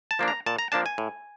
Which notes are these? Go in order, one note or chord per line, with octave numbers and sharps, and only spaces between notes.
A5
F3 A#3 D4
A#5
A#2 A5
A#5
F3 A#3 D4 A5
G#5
A2